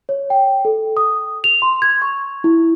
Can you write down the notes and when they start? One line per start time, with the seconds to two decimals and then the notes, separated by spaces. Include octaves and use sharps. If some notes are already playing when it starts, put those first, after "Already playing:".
0.09 C#5
0.30 G5
0.65 A4
0.97 D#6
1.44 F7
1.62 C6
1.82 G#6
2.02 C#6
2.44 E4